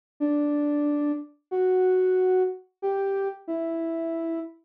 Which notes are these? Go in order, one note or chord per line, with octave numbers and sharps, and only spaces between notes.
D4
F#4
G4
E4